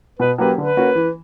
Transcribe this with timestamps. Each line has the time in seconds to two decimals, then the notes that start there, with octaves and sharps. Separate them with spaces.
0.19 B2 B4
0.38 F#3 A#3 C#4 G4 B4
0.57 D3 B4
0.77 A#3 C#4 F#4 A#4
0.95 E3